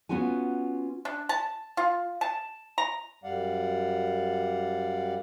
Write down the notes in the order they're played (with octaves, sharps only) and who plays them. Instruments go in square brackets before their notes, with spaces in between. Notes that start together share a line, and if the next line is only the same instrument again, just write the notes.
[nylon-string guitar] B3 C#4 F4 F#4 G#5
[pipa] D4
A5
F4
A5
A#5
[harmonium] F#2 G3 D5 F5 F#5